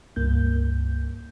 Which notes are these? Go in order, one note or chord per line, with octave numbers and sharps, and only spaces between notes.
C#2 G2 A#3 G6